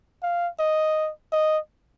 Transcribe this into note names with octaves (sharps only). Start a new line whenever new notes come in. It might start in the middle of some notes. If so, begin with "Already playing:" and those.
F5
D#5
D#5